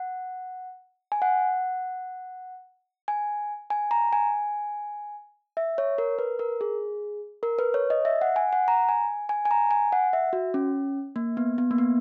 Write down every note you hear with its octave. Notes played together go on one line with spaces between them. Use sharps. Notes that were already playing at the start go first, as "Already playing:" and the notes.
Already playing: F#5
G#5
F#5
G#5
G#5
A#5
G#5
E5
C#5
A#4
B4
A#4
G#4
A#4
B4
C#5
D#5
E5
F#5
G#5
F#5
A#5
G#5
G#5
G#5
A#5
G#5
F#5
E5
F#4
C#4
A#3
B3
B3
A#3
B3